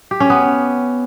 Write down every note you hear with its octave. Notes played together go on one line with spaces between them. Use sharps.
G4
C#4
B3